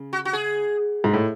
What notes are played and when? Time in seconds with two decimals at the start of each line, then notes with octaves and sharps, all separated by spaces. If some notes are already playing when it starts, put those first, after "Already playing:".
Already playing: C#3
0.13 F#4
0.25 F#4
0.33 G#4
1.04 G#2
1.13 A2